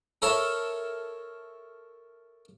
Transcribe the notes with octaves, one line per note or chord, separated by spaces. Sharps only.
A4 A#4 C#5 E5